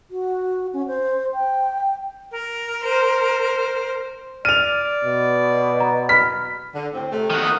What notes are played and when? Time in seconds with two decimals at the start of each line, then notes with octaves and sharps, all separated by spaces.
0.10 F#4
0.73 C#4
0.87 C5
1.34 G5
2.32 A#4
2.84 C5
4.45 D5 F6 D#7 F7
5.05 B2
5.80 A#5
6.09 B5 F6 B6
6.75 D3
6.94 A2 C4
7.12 C3 A3
7.30 D#3 F#4
7.44 D#4 F4 D#5